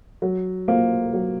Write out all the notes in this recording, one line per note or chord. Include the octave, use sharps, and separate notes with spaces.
F#3
A#3 F4 C5
F#3